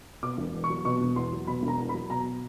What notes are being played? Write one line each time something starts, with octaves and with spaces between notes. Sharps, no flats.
B2 D6
E1
E2
C#6
F#3
B2 C#6
E1
E2 C6
F#3
B2 B5
E1
A#5
E2
B5
F#3
B2 A#5